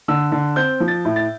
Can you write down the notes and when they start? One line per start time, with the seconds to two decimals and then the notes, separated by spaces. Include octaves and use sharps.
0.08 D3 E6
0.32 D3
0.56 C4 G6
0.80 F3
0.88 A6
1.05 A2
1.16 A6